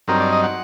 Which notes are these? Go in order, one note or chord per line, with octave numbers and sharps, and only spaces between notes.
G2 F#3 C4 D#4 A#4
D5
D#5
F#5